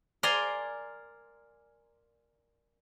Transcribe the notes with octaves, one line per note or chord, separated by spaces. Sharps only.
A#4 D5 F5 G#5 A#5 C6